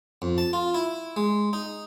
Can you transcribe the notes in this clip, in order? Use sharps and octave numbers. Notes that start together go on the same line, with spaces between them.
F2
A5
F4
E4
G#3
D#4